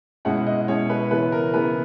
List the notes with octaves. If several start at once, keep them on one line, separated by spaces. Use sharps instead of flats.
B2 G#3 C#4 E4 F#5
D#5
B2 G#3 C#4 E4 C#5
B4
C#3 E3 B3 E4 B4
A#4
C#3 E3 B3 E4 B4